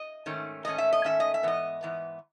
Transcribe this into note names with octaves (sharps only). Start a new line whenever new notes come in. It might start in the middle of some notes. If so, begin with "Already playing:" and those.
Already playing: D#5
G#2 D#3 A3 C#4
G#2 D#3 A3 C#4 D#5
E5
D#5
G#2 D#3 A3 C#4 E5
D#5
E5
G#2 E3 B3 D#5
G#2 E3 B3